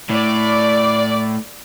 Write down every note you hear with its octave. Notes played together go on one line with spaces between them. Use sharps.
A2 D5